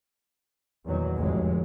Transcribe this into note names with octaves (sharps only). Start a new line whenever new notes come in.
E2 A#2 D#3 F#3
F1 D2 A2 F#3 G#3